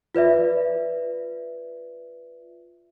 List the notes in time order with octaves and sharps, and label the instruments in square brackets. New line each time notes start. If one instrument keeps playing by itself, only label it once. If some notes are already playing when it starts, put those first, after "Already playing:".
[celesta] F4 B4 D5 E5